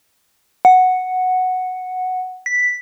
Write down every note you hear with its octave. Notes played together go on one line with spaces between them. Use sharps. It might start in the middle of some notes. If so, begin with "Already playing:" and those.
F#5
B6